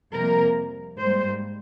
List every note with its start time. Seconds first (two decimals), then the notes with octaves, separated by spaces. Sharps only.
0.13 F2 C3 G3 A#3 A#4
0.98 G#2 G3 A#3 C5